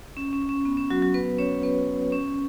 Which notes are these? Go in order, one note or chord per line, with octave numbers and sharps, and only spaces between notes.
C#4
C#4
C#4
B3
C#4
F#3 F#4
F#3 F#4
B3 B4
C#4 C#5
B3 B4
C#4